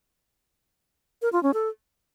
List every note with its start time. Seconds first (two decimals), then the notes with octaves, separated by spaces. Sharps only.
1.22 A#4
1.33 F4
1.43 C#4
1.54 A4